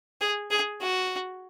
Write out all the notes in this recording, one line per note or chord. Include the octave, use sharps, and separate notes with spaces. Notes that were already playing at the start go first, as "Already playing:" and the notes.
G#4
G#4
F#4